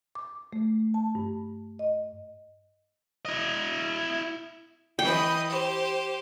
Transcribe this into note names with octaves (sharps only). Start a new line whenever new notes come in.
D6
A3
A5
G2
D#5
E4 D#5
E3 B4 D#5 G5
G4 C5